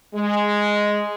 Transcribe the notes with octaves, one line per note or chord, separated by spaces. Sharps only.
G#3